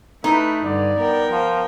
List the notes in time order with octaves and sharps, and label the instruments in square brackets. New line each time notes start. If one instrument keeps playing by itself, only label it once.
[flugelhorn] A3 [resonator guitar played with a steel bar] D#4 [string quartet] E4 B4
[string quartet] G2 D3 [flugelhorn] D5
[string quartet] B3 A#4 G5
[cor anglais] F3